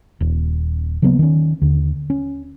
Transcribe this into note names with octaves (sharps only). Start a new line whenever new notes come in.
D#1
C#3 F#3 A#3 B3
D#3 C#4
D#2 D3
C#4